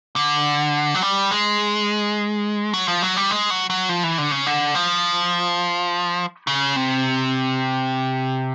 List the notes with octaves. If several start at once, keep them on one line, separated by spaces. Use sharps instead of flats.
D3
F#3
G3
G#3
F#3
F3
F#3
G3
G#3
F#3
F#3
F3
E3
D3
C#3
D3
F3
C#3
C3